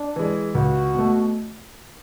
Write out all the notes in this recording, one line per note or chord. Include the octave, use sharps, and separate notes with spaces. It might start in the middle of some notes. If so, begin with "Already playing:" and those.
Already playing: D4
E3 G#3
C#2 F#4
B2 A3